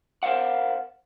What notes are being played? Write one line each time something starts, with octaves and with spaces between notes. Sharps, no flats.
A#4 C5 D5 F5 F#5